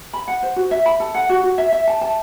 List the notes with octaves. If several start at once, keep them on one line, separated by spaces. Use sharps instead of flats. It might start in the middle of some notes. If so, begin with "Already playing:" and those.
B5
F#5
C5
F#4
E5
B5
A4
F#5
F#4
F#4
E5
E5
A5
A5